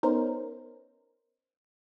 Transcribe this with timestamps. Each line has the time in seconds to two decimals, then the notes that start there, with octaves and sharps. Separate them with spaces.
0.03 B3 C#4 D#4 A#4 C5